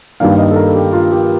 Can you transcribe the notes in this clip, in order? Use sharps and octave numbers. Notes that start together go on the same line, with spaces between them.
G2 D#3 A#3 D4 F5
D#5
A4
A#4
A4
G4
F4
G4